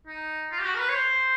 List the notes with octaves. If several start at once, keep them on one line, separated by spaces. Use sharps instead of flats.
D#4
F4
G4
F#4
A#4
B4
C#5
C5